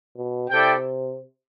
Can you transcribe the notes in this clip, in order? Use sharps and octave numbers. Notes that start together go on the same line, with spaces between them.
B2
C3 E4 A4 D5 G5